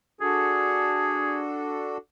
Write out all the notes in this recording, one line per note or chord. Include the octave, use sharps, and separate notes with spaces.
D4 F#4 G#4 A4